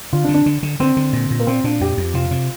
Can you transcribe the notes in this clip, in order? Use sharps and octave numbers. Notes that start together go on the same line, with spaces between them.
D3 F4
D4
D3
D4
D3
D3
D3 C4
D3
A#2
A#2
A#3
A#2 C4
A#2 D4
F2 G4
F2
C3 F4
C3